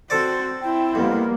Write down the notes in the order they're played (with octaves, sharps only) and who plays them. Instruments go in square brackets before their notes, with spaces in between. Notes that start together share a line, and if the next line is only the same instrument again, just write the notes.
[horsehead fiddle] C4 F#4 [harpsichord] A4 C5 D5
[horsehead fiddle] C4 E4 [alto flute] G5
[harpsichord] F2 [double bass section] G3 A#3 [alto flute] B3